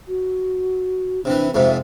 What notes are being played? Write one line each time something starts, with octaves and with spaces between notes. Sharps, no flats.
F#4
C3 E3 D4
F2 G#2 C3 E5